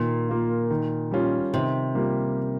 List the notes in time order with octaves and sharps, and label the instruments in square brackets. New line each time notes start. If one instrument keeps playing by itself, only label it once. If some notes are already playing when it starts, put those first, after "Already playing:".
Already playing: [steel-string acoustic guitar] A#2 [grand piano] D#3
[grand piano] A#3 F4
D#3
G3 C#4 F4
[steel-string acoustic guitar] C3 [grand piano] D#3
[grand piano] G3 A#3 F4